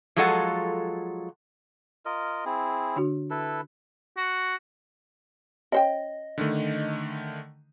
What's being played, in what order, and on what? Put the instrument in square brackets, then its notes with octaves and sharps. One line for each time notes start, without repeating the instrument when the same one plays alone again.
[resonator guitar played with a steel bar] F3 F#3 G#3 F4 A4 F#5
[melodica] F4 A#4 D#5
C4 E4 G#4
[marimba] D3 D4 F#4
[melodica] E4 A4 B4
[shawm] F#4
[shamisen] C#4 C5 G5 [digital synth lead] D#5
[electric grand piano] D3 D#3 A3